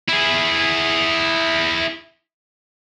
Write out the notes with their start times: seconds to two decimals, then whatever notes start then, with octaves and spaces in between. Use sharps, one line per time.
0.09 E4 G#4